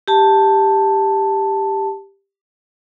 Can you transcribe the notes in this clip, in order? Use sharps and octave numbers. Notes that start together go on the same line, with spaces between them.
G4 A5